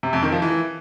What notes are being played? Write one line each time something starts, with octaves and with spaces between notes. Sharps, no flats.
C3
F2
D#3
F3
E3